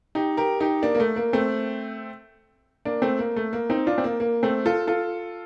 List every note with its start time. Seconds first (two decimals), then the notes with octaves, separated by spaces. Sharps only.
0.15 D#4 G4
0.37 G4 A#4
0.60 D#4 G4
0.82 A#3 D4
0.95 A#3
1.00 A3
1.16 A#3
1.33 A3 C4
2.85 A#3 D4
3.02 A3 C4
3.19 A#3
3.36 A3
3.53 A#3
3.70 C4 D#4
3.87 D4 F4
3.98 C4
4.04 A#3
4.20 A#3
4.43 A3 C4
4.66 F4 A4
4.87 F4 A4